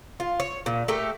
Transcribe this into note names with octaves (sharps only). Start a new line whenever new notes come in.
F4
C#5
A#2
A3 G4 A4 A#4